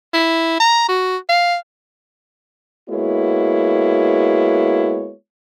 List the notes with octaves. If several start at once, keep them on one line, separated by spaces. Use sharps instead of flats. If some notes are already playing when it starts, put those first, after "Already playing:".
E4
A#5
F#4
F5
G#3 A#3 B3 E4 F#4 C#5